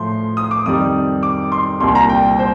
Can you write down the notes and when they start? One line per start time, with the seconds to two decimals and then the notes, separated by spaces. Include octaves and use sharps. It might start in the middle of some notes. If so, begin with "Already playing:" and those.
Already playing: A2 F3 C6
0.37 D#6
0.51 D6
0.65 F2 D#3 G3 D#6
1.23 D6
1.52 C6
1.80 C2 A#2 G3 C6
1.95 A#5
2.09 G5
2.39 C5